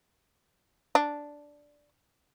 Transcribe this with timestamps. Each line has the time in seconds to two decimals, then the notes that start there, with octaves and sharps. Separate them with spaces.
0.95 D4